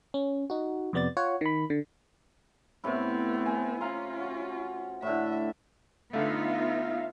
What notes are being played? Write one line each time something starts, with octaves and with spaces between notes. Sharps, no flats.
C#4
D#4 F#4
F2 C3 B3 D5 A6
F4 C#5 F#5
D#3 B5
D3
A2 C3 B3 C4 E4
G#5
C#4 F4 F5 A#5 C6
F#4
A2 D3 E5
D3 A3 B3 D#4 F4 E5 F5